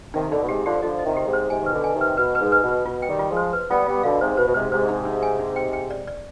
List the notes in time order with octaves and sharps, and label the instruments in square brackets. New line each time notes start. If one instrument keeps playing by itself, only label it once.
[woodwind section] C3 D#3 [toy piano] D#4
[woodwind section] B2 D3 [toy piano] D#4
[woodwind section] B2
[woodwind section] G#2 C3 [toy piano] G4
[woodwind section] D3 F3 [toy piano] G4
[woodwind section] D3 F3 [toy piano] D#5
[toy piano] D#5
[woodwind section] C3 D#3
[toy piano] G4
[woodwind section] G#2 C3
[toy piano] C5
[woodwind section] G#2 C3 [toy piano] G#5
[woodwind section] D#3 [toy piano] B4
[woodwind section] B2 D3
[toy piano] G#5
[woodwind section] C3 D#3
[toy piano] B4
[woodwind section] B2 [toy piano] B4
[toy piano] B4
[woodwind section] G#2
[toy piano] B4
[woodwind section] B2
[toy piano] B4
[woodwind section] B2 [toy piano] F4
[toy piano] G5
[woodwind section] D#3 G3
[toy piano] F4
[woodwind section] F3 G#3
[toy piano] C5
B4
[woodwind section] G3 B3 [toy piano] F4
[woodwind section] G3 B3 [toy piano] F4
[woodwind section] B2 D3 [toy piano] F5
[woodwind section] G#2 C3 [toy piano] C5
[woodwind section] B2 [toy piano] C5
[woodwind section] B2
[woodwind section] G#2 C3 [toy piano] C5
[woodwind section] G#2 C3 [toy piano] C5
[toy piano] D#4
D#4
G#5
D#4
G5
G5
D5
D5